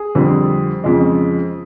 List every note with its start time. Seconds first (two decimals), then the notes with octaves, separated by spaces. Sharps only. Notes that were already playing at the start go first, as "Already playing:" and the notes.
Already playing: G#4
0.15 F2 D3 G3 C4
0.84 F2 C#3 F3 G#3